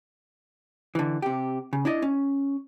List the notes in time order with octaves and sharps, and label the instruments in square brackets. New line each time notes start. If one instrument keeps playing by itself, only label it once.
[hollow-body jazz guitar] D3 E3
C3 G4
C#3
D4 E4 D5 D#5
C#4